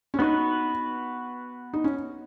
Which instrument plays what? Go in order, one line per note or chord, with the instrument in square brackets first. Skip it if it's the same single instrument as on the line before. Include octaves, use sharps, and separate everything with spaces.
[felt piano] C#4
[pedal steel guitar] B3 F#4 B4 [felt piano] D#4
[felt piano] D#4
C#4